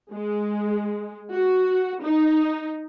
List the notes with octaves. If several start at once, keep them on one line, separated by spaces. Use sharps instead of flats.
G#3
F#4
D#4